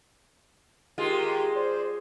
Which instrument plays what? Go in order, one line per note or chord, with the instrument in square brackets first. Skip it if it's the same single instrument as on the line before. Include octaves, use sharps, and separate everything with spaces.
[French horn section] D#3 G4 [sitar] G#3 F4
[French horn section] C5 D5